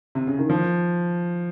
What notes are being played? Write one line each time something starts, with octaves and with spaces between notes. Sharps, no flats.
C3
C#3
D#3
F3